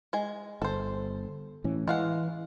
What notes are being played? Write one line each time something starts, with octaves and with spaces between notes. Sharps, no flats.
G#3 G#5
G1 A4 C5
A2 E3 C#4
E3 G#3 F5 F#5